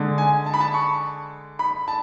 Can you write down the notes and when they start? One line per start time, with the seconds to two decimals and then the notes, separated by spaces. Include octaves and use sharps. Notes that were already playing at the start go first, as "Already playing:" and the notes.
Already playing: D3 G#3
0.18 G#5
0.46 A5
0.54 B5
0.61 A5
0.74 C#6
1.59 B5
1.88 A5